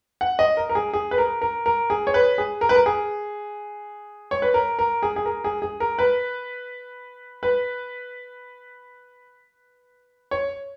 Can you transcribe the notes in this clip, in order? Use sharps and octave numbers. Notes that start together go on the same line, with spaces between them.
F#5
D#5
A#4
A#4
G#4
G#4
B4
A#4
A#4
A#4
G#4
C#5
B4
G#4
A#4
B4
A#4
G#4
C#5
B4
A#4
A#4
G#4
G#4
A#4
G#4
G#4
A#4
B4
B4
C#5